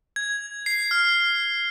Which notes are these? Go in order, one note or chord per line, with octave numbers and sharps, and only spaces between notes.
G#6
C7
F6